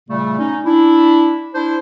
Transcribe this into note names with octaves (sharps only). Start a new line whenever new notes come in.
A#2 C#3 G3 A3
C#4 D#4
D4 E4
D4 E4 C5